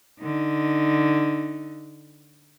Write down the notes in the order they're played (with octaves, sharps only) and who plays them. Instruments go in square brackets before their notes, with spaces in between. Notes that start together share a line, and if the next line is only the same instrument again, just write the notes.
[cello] D3 D#4